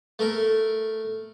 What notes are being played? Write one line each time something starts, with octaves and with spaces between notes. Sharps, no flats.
A3 A#4